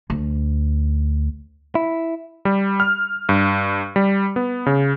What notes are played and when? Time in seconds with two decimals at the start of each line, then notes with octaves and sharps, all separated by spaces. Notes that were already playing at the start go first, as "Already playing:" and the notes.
0.10 D2
1.75 E4
2.45 G3
2.80 F6
3.29 G2
3.96 G3
4.36 B3
4.66 C#3